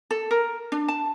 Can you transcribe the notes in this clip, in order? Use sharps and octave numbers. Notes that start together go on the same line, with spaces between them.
A4
A#4
D4
A5